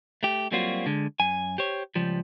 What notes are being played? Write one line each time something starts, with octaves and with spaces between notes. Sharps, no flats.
A3 G4
F#3 G3 A#3 C4 F4 F#4
D3 G#3
F#2 G#5
G4 C5 C#5
C#2 F3 G3